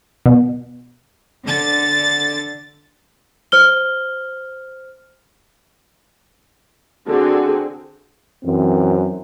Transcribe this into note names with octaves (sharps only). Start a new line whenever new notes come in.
B2
D3 A6
C5 F6 G7
D3 C4 F#4 G#4
F#2 E3 C4